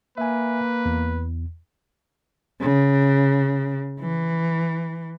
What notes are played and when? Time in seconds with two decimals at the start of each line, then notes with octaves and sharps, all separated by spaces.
0.18 A#3 B4 E5 G#5
0.86 E2
2.61 C#3
4.00 E3